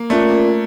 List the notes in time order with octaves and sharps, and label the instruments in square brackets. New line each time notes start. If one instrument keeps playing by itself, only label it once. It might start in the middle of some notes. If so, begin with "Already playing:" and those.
Already playing: [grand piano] A#3
[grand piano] A3 [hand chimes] C#4 F4 A#4 D5